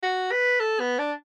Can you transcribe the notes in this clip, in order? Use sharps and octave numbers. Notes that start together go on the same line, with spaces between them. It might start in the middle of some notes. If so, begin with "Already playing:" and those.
F#4
B4
A4
B3
D4